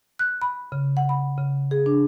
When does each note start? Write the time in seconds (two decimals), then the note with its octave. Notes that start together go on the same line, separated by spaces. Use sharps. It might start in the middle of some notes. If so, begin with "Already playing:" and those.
0.19 F#6
0.42 B5
0.72 C#3
0.97 F#5
1.09 B5
1.38 C#3
1.71 G#4
1.86 D4